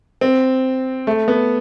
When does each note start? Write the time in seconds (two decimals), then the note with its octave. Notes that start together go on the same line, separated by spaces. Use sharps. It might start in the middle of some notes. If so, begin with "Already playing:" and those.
0.21 C4
1.07 A3
1.28 B3